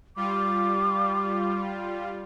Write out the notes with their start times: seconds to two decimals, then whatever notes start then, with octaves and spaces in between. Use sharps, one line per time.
0.16 G3 F4 D6